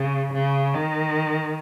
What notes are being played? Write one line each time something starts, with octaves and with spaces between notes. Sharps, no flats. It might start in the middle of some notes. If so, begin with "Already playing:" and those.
Already playing: C#3
C#3
D#3